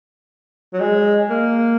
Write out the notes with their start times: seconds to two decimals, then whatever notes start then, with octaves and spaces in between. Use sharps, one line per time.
0.73 F#3
0.80 G#3
1.30 A#3